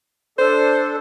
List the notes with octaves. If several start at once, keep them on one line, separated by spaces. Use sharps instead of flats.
D4 A4 C5